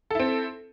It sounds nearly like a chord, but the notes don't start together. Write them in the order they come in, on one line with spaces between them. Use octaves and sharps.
A4 E4 C4